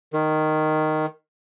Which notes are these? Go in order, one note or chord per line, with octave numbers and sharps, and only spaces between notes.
D#3